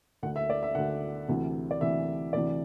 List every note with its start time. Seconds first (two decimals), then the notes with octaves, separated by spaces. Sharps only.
0.23 D2 D3 F#5
0.36 E5
0.50 D5
0.63 E5
0.75 D2 D3 F#5
1.28 D2 C3 E3
1.71 D5
1.81 D2 C3 E3 E5
2.33 D2 C3 E3 D5